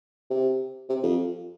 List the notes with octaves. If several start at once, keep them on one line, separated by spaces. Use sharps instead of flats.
C3
C3
F2